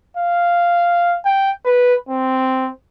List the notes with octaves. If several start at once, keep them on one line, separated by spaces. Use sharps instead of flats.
F5
G5
B4
C4